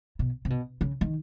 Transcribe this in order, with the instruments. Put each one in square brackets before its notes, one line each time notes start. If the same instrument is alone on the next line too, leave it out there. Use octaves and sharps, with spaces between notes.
[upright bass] B2
C3
B2
C#3
D#3